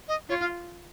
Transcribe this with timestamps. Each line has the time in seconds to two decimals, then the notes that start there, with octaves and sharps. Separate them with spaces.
0.08 D#5
0.29 F4 C#5
0.41 F5